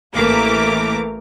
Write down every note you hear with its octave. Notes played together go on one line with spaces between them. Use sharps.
A1 E3 A3 A#3 A#5 D6